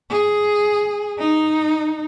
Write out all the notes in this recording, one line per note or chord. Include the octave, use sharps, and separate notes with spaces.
G#4
D#4